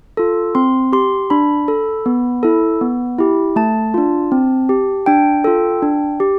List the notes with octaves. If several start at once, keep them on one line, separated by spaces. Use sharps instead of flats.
F4 A4
C4 C6
G4 C6
D4 B5
A4
B3
E4 A4
B3
E4 G4
A3 A5
D4 F4
C4
G4
D4 G5
F4 A4
D4
G4